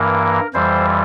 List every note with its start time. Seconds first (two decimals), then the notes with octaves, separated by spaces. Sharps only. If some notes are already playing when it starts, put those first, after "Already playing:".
Already playing: G2 E3 A#3 A#4
0.54 F2 E3 G3 C5